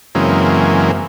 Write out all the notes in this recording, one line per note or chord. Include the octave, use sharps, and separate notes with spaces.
F#2 C#3 E3 G#3 A#3 C4